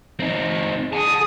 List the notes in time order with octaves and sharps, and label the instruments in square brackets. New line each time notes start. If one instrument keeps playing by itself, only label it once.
[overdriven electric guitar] C4 D#4
[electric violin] G#4 D#6 [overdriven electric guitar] F#5 A5